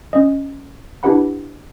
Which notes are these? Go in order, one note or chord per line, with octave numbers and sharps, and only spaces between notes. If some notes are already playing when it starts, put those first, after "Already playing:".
C#4 D#5
D4 E4 G4 B4 F#5 B5